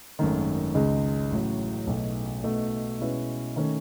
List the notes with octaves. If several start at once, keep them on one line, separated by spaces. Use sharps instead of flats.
G#1 F#2 D#3 A3
C#2 C#3 G#3 D#4
A1 A2 F#3
B1 B2 A3 D#4
B2 A3 D#4
B2 G#3 C#4 E4 B4
D#3 A3 C#4